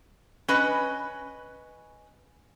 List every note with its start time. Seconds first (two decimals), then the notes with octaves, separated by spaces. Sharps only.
0.48 C#4 B4 D#5